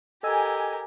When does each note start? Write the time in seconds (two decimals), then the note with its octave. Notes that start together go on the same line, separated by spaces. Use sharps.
0.23 G4 A4 A#4 D#5 G#5 E6